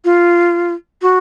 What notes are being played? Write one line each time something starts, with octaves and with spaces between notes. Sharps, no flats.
F4
F#4